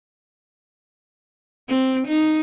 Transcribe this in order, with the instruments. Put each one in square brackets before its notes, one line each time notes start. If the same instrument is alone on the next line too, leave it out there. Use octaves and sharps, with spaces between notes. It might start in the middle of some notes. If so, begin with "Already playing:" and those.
[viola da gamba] C4
D#4